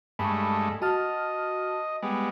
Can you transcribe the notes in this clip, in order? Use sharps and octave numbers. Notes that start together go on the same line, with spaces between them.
G2 G#3 A3 B5 C#6
F#4 D#5 A5 F6
G3 G#3 B3